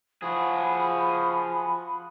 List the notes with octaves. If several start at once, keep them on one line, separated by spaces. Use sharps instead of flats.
F3 F#4 G#4 B5